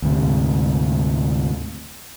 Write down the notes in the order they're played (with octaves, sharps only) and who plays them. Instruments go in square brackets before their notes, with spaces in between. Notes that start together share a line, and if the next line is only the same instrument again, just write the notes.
[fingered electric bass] D2 G#2 C3